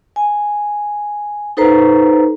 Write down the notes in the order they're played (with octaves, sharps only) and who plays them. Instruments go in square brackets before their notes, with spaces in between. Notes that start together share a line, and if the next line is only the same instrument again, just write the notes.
[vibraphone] G#5
D#4 A4 B4 C5 A#5